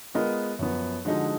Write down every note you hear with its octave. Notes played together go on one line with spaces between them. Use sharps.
G#3 B3 F4 A#4 D#5
F#2 F3 B3
D3 F3 G#3 D#4 F#4